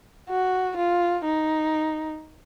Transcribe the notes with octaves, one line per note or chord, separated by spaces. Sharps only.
F#4
F4
D#4